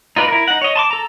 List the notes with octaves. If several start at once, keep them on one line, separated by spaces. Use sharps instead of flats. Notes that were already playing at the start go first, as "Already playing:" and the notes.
D#4 F4 B4 D5
E4 A#4
D#4 F#5
C#5 D#5
A5 C6 D6
A4 A#5